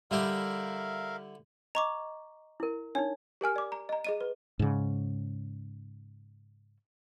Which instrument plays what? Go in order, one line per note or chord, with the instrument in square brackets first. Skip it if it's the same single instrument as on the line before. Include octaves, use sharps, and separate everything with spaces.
[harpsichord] D3 E4 G4 [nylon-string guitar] G3 [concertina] A#4 E5 F5
[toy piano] D#5 [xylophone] A#5 C#6 D6
[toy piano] E4 A#4
[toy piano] D4 D#4 [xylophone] C#5
[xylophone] G4 A#4 G#5 F6
D5 D6
A#5
D#5 A#5
G#4 D#5 D#7
B4
[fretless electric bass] G#2 C#3